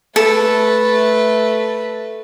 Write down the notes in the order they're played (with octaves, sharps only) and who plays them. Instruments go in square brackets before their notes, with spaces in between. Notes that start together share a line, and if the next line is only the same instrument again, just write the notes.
[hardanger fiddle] A3 B4 [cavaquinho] A4